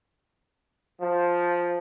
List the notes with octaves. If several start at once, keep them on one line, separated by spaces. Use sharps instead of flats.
F3